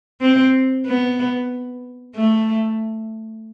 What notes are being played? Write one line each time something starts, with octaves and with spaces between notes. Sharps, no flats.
C4
B3
A3